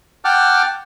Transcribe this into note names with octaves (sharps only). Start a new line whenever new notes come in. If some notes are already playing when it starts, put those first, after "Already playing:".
F#5 G5 A5 D6 F6